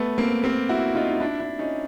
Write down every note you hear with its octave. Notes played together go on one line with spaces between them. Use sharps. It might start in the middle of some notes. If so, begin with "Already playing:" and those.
Already playing: A3 B3
A#3 C4
A#3 C4
E4 F#4
D#4 F4
D#4
D4 E4
D4 E4
C#4 D#4